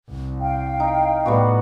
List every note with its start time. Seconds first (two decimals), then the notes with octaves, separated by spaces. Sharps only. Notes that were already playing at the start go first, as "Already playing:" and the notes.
0.11 C2
0.40 F5 G5
0.80 D#4
1.26 A2 G3 B3 F#4